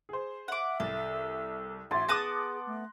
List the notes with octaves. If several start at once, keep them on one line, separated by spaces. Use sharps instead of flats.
G#4 C5
E5 F#5 D6
C2 A4
A1 F#4 E5 C6 A6
B3 G#4 A5 D6 D#6 F#6 A#6
A3